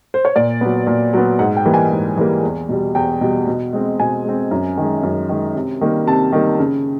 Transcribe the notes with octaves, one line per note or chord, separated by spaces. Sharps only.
C5
C#5
A#2 D5
F#3 B3
A#2
F#3 B3
G#2 F#5
G5
E3 G3 A#3
G#5
G#2
E3 G3 A#3
E2
B2 G3
E2 G5
B2 G3
B2
G#3 C4
B2 G#5
G#3 C4
F#2
D#3 G#3
F#2
D#3 G#3
C3
D#3 G3 A#3
C3 A5
D#3 G3 A#3
C#3